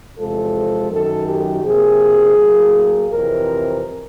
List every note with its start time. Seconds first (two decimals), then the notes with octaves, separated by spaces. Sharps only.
0.18 E2 C3 F3 G#3 A4
0.91 F#2 D#3 F#3 A4
1.27 G4
1.64 C3 F3 A#3 G#4
2.36 A2 F#3 A#3
3.10 F2 C3 E3 A#4